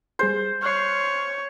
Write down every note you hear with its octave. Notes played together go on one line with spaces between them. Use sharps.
G3 G#4 C5 G6
C#5 F6 F#6 C7